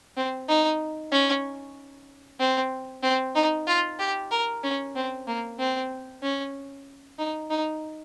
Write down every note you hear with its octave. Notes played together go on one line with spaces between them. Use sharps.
C4
D#4
C#4
C4
C4
D#4
F4
G4
A#4
C#4
C4
A#3
C4
C#4
D#4
D#4